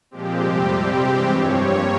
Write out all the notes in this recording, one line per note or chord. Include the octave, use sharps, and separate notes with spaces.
A#2 F3 G#3 C4 G4
F2 C3 G3 C4 G4
C3 G3 C4 G4
G2 E3 G#3 C4 G4
G2 F3 C4 C#5
G2 G3 A#3